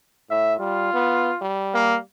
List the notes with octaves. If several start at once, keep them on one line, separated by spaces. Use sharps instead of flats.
A2 E5
G3 F4
B3
G3
A#3